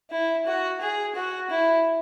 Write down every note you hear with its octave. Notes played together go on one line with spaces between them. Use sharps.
E4
F#4
G#4
F#4
E4